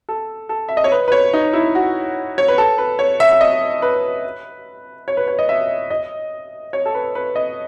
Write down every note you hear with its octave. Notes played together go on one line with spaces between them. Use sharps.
A4
A4
E5
D#5
C#5
B4
B4
C#5
D#4
E4
F#4
C#5
B4
A4
B4
C#5
E5
E5
D#5
B4
C#5
B4
C#5
D#5
E5
D#5
C#5
A4
B4
B4
D#5